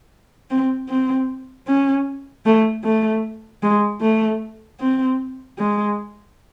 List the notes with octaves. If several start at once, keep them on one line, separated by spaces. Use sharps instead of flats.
C4
C4
C#4
A3
A3
G#3
A3
C4
G#3